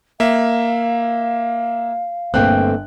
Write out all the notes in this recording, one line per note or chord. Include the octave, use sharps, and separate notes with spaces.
A#3 E5 F5
G1 A3 A#3 C4 G5 F#6